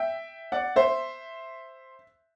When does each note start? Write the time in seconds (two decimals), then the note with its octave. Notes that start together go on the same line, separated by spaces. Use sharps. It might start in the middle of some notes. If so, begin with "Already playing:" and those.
Already playing: E5 G5
0.52 D5 F#5
0.76 C5 E5